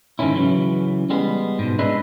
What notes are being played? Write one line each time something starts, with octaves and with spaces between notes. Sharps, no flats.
G#2 D3 D#3 F#3 C#4 E4
C#3 E3 F#3
G3 G#3 B3
G#2 B2
D4 E4 G#4 B4 D5 D#5